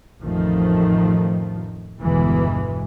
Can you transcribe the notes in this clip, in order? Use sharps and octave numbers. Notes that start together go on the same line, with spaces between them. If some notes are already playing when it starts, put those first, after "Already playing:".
A1 F2 D#3 F3 A3
G1 E2 B2 E3 G#3